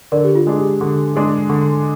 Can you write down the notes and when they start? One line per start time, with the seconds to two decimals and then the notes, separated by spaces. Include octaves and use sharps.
0.12 D3 A#4 D5
0.24 G4
0.35 F4
0.47 G#3 D4 G#4
0.58 G4
0.81 D3
1.16 G#3 D4 G#4
1.50 D3